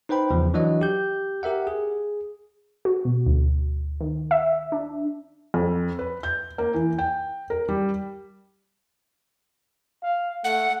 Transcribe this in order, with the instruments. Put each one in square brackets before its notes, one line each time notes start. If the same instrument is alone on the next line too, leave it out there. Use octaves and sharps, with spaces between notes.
[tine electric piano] D#4 B4 C5 G5 B5
E2 C#3 F3
E3 F#3 D4 F#4 D#5
G4 G6
G4 A#4 E5 F#5
G#4
[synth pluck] F#4
B2
D2
D#3
E5
D4
[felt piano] F2
B4
G6
A#3
E3
G5
A#4
G3
[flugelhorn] F5
[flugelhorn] A3 [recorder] F#5